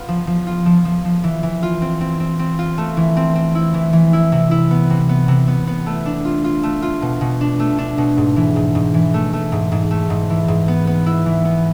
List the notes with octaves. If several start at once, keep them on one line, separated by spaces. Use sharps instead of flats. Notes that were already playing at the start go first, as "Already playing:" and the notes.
Already playing: B3 F4
F3
F3
F4
F3
F3
F3
E3
E3
F4
C4
C4
C4
C4
F4
A3
E3
C4
C4
E4
E3
E3
E4
C3
E4
B3
C3
B3
C3
B3
B3
A3
D4
F4
F4
A3
F4
B2
B2
D4
A3
D4
B2
G#2
E3
G#2
G#2
E3
A3
A3
G#2
G#2
A3
G#2
E3
G#2
B3
B3
E4
E3
B3